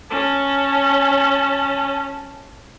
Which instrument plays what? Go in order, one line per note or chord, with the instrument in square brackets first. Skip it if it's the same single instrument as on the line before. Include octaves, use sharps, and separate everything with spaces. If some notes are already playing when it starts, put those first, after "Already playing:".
[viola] C#4 A5